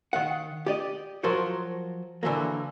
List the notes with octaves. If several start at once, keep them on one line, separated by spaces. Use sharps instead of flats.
D#3 F5 F#5
G4 D5 D#5
F3 F#3 A#4 C5 C#5
D3 E3 F#3 A#3